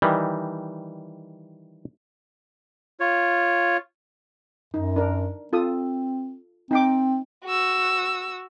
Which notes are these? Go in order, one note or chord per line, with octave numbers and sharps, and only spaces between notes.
D#3 E3 G3
F4 C#5
F#2 D#4
D4 A#4
C4 F4 A4 D#6
C4 D#4 G5 D6
F#4 E6